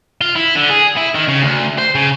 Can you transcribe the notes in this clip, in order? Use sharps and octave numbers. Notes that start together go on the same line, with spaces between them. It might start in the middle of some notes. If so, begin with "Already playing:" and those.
F4
E4
D3
G#4
E4
D#3
C#3
D2
C5
C#3